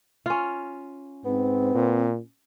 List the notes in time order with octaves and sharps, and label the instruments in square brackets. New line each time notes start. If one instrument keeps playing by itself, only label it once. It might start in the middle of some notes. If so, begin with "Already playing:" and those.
[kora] C#4 F4
[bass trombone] G#2 [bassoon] B3 [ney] C4
[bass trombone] A#2